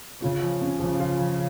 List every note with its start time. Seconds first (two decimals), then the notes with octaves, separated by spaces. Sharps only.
0.22 C#3 F4
0.42 F3
0.61 C#4
0.80 C#3 F3
1.00 F4
1.19 F3